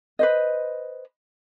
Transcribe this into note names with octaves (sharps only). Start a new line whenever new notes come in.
B4 C5 D#5